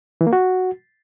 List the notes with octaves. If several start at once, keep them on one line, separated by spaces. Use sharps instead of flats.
E3
A#3
F#4